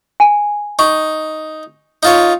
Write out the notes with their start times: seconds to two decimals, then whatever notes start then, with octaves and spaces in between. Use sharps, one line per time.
0.20 G#5
0.79 D#4 C#6
2.03 D#4 F4 C#5